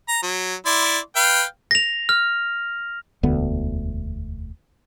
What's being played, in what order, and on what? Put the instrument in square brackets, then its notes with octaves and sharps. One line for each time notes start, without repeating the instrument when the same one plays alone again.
[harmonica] A#5
F#3
E4 D5 C6
B4 F5 G5
[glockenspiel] A#6 F7
F6
[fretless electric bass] E1 D2 D3 B3